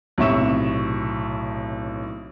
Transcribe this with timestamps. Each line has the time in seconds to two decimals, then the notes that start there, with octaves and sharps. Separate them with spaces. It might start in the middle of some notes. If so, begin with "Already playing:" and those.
0.18 B1 A2 C3 E5 C#6 E7